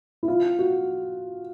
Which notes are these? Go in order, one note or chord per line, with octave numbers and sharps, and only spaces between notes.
E4
F4
F#4